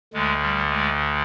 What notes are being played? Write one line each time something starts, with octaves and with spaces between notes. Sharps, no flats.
D2 D3 G#3
G3
G#3